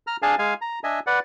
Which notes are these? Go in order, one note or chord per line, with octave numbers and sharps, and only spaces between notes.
A#5 F6
D4 G#4 F5 G#5 A5
G#3 F5 G#5
A#5
D4 D#5 E5 G#5
B4 D5 F#5